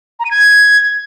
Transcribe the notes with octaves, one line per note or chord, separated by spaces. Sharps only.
A#5
D#7
G#6